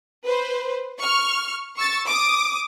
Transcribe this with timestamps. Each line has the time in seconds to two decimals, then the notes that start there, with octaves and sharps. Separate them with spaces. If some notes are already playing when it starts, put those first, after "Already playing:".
0.25 B4 C5
0.99 C#6 F6
1.77 C#6 E6 A6
2.08 D6 D#6